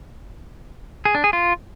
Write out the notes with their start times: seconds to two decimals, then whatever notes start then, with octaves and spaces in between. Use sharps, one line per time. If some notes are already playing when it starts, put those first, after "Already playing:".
1.05 G#4
1.15 D4
1.24 G#4
1.33 F4